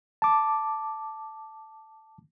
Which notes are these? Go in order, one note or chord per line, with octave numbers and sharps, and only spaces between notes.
A5 D6